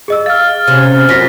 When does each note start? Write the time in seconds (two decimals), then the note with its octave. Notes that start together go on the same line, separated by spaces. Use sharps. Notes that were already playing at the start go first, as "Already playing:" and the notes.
0.08 G#4 D#5 E6
0.26 F5 F6 A6
0.67 C3 C#4
1.09 F#2 F4 A#6 B6